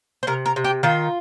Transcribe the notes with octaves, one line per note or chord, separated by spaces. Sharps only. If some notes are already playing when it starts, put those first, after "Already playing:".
C5
C3 A#4
A#4
C3
G4
D#3 F4